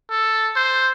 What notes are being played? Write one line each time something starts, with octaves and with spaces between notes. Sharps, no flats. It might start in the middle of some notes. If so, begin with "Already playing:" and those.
A4
C5